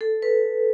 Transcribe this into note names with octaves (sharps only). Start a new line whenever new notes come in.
A4
B4